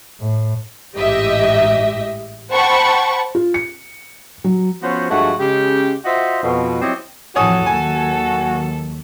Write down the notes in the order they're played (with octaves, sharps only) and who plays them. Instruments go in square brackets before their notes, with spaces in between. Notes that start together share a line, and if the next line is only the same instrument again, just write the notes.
[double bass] A2
[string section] A1 G#2 G4 D#5 E5
C5 F#5 G5 A5 B5 C#6
[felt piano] F4
C#7
F#3
[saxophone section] F3 B3 C#4 F#4 C5
G2 F3 G#3 A3 F#4
C#3 G#3 G4
F4 F#4 C5 D#5 E5
F2 B2
F#3 C4 E4 G4 C#5 D#5
[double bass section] F2 A2 E3 [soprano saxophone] F#4 [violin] A4 [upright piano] C#5 G#5 D#6
[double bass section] D#2 D#3 F#3 [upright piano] G#5